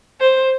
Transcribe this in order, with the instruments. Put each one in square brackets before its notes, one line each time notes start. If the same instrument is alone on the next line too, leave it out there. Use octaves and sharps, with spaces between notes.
[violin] C5